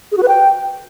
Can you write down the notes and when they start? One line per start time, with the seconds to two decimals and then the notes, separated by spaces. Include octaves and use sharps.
0.12 G#4
0.17 F#4
0.23 B4
0.28 G5